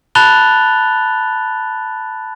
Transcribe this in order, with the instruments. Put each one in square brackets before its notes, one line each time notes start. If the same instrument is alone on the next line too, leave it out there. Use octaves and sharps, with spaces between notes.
[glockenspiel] A5 B5 F#6 A6 F7 G7